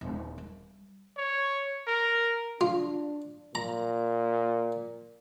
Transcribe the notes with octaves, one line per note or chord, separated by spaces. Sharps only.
D#1
G3
C#5
A#4
D4 F4
A#2 A#5